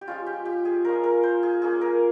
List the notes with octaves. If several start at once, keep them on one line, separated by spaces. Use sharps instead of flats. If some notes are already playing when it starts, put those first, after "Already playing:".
G4
F3 G#3 C#4 F4
G4
G4
G#4
F3 G#3 C#4 F4 A#4
A#4
C5
G#4
A#3 C#4 F4 G#4
A#4